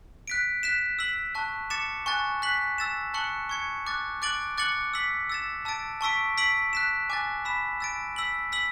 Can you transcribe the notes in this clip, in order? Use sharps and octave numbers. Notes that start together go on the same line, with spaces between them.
F#6 B6 D7
F#6 B6 E7
E6 B6 F#7
A5 C#6 F#6
D6 A6 C#7 E7
G#5 C#6 F#6 A6
F#6 B6 F#7
E6 A6 E7
A5 C#6 F#6 C#7 F#7
C#6 G#6 C#7
D6 F#6 A6
D6 F#6 A6 D7 F#7
D6 F#6 A6 C#7 F#7
E6 B6 F#7
E6 A6 E7
A5 E6 A6 D7
A5 C#6 E6 B6 D7
E6 B6 D7 F#7
F#6 B6 E7
G#5 D6 F#6 A6
B5 E6 B6 E7
E6 A6 D7
E6 B6 F#7
E6 B6 F#7